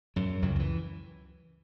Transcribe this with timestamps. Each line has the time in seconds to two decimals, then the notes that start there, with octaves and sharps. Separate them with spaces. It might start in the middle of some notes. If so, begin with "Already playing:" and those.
0.16 F#2 F#3
0.42 C#2 F#2 C#3 F#3
0.56 F#3
0.59 E3